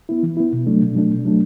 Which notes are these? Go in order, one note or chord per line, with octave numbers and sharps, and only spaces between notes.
B3 E4
E3
B3 E4
B2
F#3 A3 D4
B2
F#3 A3 D4
B2
F#3 A3 D4